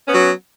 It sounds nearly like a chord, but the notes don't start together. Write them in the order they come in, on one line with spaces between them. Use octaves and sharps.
C#4 B3 F#3